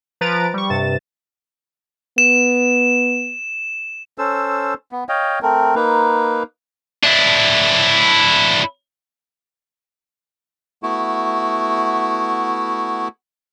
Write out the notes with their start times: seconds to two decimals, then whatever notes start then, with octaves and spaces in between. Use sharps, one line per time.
0.21 F3 B4 A#5 A6 D7
0.54 G3 C#6
0.70 G2 C3 A6 E7
2.18 B3 E7
4.18 C#4 A4 C5 E6
4.92 B3
5.09 C#5 D#5 F5 G5
5.42 A3 C4 A#4
5.75 A#3 D#4 B4
7.04 D4 E4
10.83 A3 B3 E4 F#4